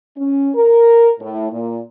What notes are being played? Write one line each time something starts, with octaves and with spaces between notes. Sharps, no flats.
C#4
A#4
A2
A#2